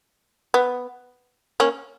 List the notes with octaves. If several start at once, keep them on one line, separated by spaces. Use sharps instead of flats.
B3
A#3 C#4